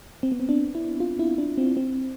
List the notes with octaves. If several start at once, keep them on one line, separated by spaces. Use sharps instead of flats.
C4
B3
C4
D4
E4
F4
E4
D4
C4
C4